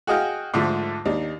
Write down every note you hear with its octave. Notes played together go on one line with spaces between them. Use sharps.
F#4 G#4 D#5 F5 G5
G#2 D3 F3 A3
D#2 D4 D#4